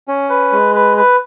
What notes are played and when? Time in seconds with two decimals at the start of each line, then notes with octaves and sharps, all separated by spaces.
0.08 C#4
0.29 B4
0.52 G#3
0.75 B4
0.97 B4